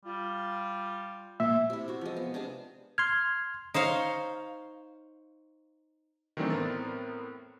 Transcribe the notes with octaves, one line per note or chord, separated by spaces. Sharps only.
G3 F4
A#2 E5
C3 E4
E4 F#4
F3 G#3
B3
C3 D4 G#4 F5
C6 F6 G#6
D#4 C5 C#5 F5
D#3 E3 F#3 A3 C4 D4
A2 B3 C4 A#4 A6